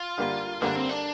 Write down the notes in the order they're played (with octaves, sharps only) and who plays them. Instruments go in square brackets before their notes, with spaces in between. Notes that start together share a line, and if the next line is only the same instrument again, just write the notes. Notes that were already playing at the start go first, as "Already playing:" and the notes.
Already playing: [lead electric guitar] F4
[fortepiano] D3 G3 A#3
[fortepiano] D3 G3 A#3 [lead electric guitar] D4
[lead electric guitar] C4
D4